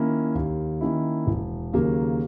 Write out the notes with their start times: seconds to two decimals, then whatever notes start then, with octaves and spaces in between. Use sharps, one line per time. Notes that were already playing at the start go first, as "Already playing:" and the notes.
Already playing: D#3 A#3 C#4 E4
0.35 D#2
0.81 D#3 A#3 C#4 E4
1.27 E1
1.73 D#2 C#3 F#3 A#3